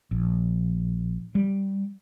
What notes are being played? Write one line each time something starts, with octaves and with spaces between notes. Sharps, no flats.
A#1
G3